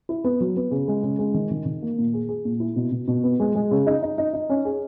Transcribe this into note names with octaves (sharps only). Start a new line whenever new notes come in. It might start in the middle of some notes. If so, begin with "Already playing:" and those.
E4
B3
F#3
B3
C#3
G#3
C#3
G#3
D#3
D#3
D#3
A#3
A#2
G#4
G#4
A#2
E4
B2
B2
B2
B3
G#3
G#3
C#3
D#4
D#4
D#4
D#4
C#4
G#4